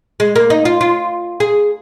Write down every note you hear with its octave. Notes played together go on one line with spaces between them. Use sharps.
G#3
A#3
D#4
F4
F4
G#4